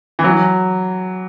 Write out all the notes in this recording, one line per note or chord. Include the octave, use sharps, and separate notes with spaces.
E3
F#3